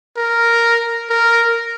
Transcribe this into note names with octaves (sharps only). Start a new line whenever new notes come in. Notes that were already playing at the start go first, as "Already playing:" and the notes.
A#4
A#4